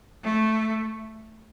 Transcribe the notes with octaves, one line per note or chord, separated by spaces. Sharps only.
A3